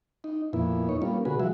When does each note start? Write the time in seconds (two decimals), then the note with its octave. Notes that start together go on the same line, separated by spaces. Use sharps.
0.24 D#4
0.53 F2 A#2 B3 E4
0.89 D#4 C#5
1.02 G3 A#3 B3 C#4 F4
1.25 B2 D3 F#4 G#4 B4
1.39 F3 F#3 G#3 F#4 E5